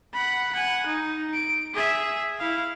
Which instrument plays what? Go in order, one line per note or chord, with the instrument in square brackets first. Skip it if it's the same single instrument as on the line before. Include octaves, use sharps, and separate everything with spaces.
[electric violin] F#5 B5
F#5 G#5
D#4
D7
G#4 E5
E4 F5